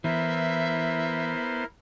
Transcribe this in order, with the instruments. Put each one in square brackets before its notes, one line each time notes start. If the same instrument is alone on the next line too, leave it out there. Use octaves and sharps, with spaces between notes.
[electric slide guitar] E3 [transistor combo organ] B3 C5 [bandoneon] E4 A#4 [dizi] E5